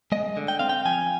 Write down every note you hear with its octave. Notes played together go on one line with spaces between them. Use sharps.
G#3 D#5
D3
G5
C4 F5
G5
F3 G#5